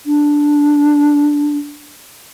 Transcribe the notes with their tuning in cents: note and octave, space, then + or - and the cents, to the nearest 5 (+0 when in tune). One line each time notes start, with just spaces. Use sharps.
D4 -5